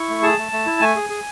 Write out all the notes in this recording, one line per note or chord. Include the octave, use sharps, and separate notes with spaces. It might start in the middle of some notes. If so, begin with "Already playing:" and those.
Already playing: E4 C#6
A3
G#4 A5
A3
A3
E4
A3 G#5
G#4
G#4